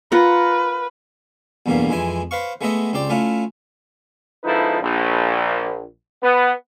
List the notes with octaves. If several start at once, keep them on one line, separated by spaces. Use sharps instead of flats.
F4 A#4 B4 F#5
B1 E2 G2 B2 E3 A#3
F2 E3 G#3 E4 G#5
B4 C5 F5 C#6
G#3 A3 B3 F#4 D#5 E5
C#2 C4 G4 D5 G5
A3 C#4 E4 F4
C#2 F3 D#4 E4 A4 B4
A#1
B3